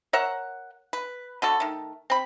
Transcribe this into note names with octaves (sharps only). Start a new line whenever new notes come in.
A#4 C#5 E5 F#5
B4
D3 F#4 A4
D#3 A3
C4 B5